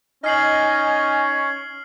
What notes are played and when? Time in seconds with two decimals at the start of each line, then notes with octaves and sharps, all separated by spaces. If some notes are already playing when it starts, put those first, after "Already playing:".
0.24 C#4 D#4 D#5 G#5 F6 C7 F#7